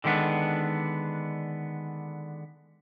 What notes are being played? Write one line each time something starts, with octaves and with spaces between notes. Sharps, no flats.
D3 D#3 G#3 B3 D4